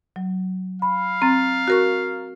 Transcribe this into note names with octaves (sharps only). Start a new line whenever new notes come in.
F#3
F5 B5
C4 A#5 A6
F#4 A#4 C#6